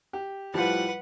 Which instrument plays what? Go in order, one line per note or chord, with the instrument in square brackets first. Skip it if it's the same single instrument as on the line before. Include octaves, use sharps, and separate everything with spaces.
[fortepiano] G4
[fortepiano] A2 F3 G3 [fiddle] B4 F#5